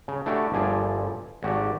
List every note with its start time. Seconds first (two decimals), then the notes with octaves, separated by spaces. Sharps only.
0.08 C#3
0.26 A3 D4 E4 F#4 G4 A4
0.52 G1 A#2 F3 E4 G#4 D5
1.43 G#1 F#4 G4 D5